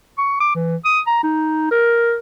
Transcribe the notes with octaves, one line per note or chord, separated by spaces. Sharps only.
C#6
D6
E3
D#6
A#5
D#4
A#4